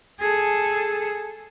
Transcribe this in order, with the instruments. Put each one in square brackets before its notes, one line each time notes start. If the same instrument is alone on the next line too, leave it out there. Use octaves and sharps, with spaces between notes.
[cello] G#4 A4